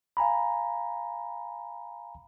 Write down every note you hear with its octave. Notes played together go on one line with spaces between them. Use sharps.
F5 G#5 A#5 B5